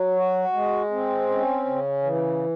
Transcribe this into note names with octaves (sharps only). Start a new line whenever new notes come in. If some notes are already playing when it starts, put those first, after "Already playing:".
Already playing: F#3
F#4
G#3
C4
C#4
C#3
E3